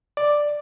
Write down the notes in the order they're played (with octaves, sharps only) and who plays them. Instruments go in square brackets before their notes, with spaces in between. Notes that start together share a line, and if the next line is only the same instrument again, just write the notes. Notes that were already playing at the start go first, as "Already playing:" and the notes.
[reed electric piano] D5